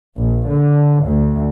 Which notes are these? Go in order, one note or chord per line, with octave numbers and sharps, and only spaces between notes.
A#1
D3
D2